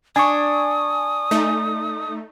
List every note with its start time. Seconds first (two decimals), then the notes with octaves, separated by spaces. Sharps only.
0.16 D4 G#5 C#6 D#6
1.31 A3 D#4